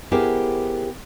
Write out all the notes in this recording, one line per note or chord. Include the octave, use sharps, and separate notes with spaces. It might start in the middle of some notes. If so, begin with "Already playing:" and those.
B3 E4 G4 G#4 A#4 C5